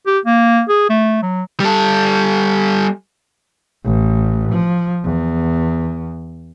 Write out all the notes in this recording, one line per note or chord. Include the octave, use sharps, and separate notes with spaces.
G4
A#3
G#4
A3
F#3
G3 A4
A1
F3
E2